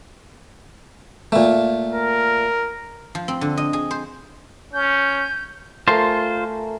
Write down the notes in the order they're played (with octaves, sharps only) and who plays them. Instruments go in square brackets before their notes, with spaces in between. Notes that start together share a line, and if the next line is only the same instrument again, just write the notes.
[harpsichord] A#2 A3
[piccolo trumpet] A#4
[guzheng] F3
C4
D3
D#5
G#4
C5
[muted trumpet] C#4 [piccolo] G6
[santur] A3 A#4 G#5 [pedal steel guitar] F4 C5